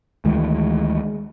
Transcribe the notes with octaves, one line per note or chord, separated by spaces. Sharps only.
D2 D#3 E3 G#3